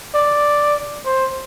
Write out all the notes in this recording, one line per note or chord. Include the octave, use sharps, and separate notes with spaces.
D5
C5